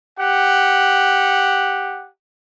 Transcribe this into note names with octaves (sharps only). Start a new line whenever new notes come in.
G4 F#5